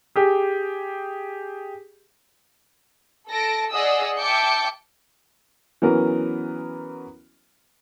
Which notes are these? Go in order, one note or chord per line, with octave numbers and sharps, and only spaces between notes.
G4 G#4
A4 A5 A#6 D7
G#4 D5 D#5 F#5 D#6 E6
E5 G5 A5 D6 G6 C#7
E3 F#3 B3 C#4 A#4